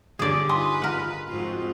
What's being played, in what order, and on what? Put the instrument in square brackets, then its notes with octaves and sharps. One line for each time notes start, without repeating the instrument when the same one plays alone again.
[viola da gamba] G2 D3 C#5 [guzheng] G#4 D5
[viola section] D#4 F4 B5 [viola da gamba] B4 [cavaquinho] G#5 C6 D#6
[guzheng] A#4 F#5
[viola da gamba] F2 G#2 F4 [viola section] C4 F#4